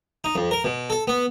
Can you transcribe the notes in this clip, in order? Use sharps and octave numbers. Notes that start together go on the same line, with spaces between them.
D#4
F2
A#4
B2
A4
B3